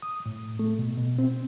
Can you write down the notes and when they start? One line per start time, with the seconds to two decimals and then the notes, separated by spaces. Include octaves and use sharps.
0.02 D#6
0.26 A2
0.59 A3
0.79 B2
0.97 B2
1.19 C4